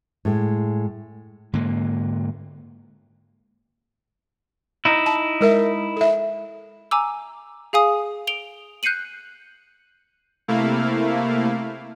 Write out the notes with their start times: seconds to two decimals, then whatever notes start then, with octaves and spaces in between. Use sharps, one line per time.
0.25 A2 G#3
1.53 G#2 D3 A#3
4.85 D#4 E4
5.06 A5
5.41 G#3 A#4 E5
5.97 A4 E5
6.91 G#5 A#5 D6 E6
7.73 G#4 F5 G#5 D#6
8.27 D7 F7 G7
8.83 F#6 G6 C7 C#7 D#7 F#7
10.48 C3 A3 A#3 E4 F5